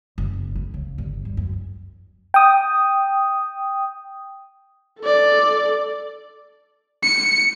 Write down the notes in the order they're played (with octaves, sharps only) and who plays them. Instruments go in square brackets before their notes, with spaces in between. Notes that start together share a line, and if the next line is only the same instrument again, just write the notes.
[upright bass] F#1
F2
C#2
G1
G2
F#2
[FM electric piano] G5 D#6
[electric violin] A4 D5
C#7